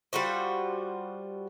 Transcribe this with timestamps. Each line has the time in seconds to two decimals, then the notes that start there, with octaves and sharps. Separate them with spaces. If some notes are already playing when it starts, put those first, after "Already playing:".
0.13 G3 F4 F#4 C5